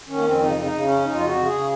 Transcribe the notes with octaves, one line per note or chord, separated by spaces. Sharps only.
D#3 C#4
A#3
F2 C4
C#3 D#4
C#3
D#4
C#3
C#4
F2
F2 D#4
F4
C#3
F#4
C#3
G#4
C#3